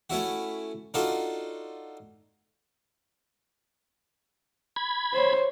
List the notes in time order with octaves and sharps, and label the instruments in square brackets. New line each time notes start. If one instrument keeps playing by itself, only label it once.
[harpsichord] A3 C#4 E4 F#4
D4 D#4 F4 F#4 A4
[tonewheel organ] B5 G#6
[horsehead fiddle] C5 C#5